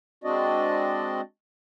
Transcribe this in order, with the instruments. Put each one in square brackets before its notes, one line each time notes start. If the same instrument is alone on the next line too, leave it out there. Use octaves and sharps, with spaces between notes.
[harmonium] G#3 C4 D4 F#4 D5 D#5